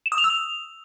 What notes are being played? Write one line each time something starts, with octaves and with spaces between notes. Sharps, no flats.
E7
D#6
F7
E6
F7